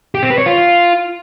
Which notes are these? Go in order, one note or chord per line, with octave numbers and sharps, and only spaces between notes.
G4
C4
B4
C#5
F4